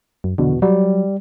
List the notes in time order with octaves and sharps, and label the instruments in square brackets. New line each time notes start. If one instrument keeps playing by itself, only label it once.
[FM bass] F#2
[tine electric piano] A#1 E2 B2 [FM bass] D3
[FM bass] F#3 [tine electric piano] G3